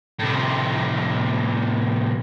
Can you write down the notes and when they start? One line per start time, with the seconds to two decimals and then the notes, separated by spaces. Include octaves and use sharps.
0.19 A2 C3